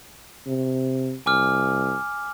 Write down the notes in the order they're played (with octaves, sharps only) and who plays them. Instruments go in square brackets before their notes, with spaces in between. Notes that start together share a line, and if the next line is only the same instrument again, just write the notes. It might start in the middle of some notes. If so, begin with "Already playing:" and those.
[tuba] C3
[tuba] C2 [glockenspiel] G#5 D6 F6